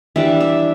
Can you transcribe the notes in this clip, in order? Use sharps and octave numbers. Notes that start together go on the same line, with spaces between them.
E3 G3 D4 E5
E5